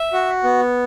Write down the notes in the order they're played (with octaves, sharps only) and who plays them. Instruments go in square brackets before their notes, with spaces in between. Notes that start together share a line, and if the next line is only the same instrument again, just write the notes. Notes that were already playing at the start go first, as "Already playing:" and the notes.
Already playing: [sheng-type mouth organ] E5
F#4
B3